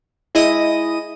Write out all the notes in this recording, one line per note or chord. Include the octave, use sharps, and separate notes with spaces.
G#3 E4 D#5 D#6 D#7